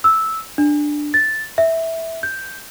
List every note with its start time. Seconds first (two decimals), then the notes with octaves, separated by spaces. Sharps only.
0.04 E6
0.58 D4
1.14 A6
1.58 E5
2.23 G6